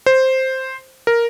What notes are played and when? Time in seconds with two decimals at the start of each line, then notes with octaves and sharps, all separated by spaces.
0.06 C5
1.07 A#4